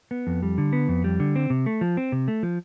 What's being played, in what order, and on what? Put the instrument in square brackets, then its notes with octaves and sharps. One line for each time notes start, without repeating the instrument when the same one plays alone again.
[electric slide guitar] B3
F2
G3
D3
B3
F2
G3
D3
C4
C3
A3
F3
C4
C3
A3
F3